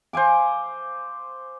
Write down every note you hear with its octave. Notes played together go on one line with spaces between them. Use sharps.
C5 F5 G#5 D6